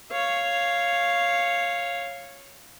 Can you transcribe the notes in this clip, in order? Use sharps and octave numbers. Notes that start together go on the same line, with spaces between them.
C#5 F5